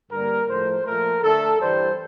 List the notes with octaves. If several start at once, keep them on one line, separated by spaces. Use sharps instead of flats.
G2 D3 G3 A#3 A#4
A2 F3 A3 C5
A#2 F3 A3 A#4
D3 A3 A4
G2 E3 G3 C5